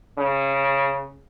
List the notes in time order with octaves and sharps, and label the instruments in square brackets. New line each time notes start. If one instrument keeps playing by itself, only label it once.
[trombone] C#3